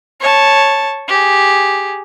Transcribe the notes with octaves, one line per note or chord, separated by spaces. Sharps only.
C#5 A5
G4 G#4